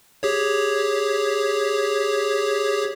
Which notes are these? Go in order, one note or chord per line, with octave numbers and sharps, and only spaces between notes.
G4 G#4 C#5